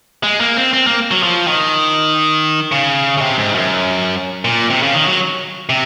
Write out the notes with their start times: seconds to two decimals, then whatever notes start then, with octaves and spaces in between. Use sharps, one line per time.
0.23 G#3
0.40 A#3
0.57 C4
0.73 C4
0.86 A#3
1.11 F#3
1.23 F3
1.47 D#3
2.72 C#3
3.18 C#3
3.21 C3
3.38 G#2
3.55 F#2
4.45 A#2
4.70 C3
4.82 C#3
4.94 D#3
5.07 F#3
5.69 C3